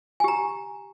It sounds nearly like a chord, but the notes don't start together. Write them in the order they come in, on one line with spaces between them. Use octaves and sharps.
G#5 G4 A#5